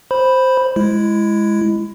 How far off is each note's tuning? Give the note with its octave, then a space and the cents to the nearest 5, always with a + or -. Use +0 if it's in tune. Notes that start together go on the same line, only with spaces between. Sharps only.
C5 +0 B5 +0
G#3 +0 E4 +15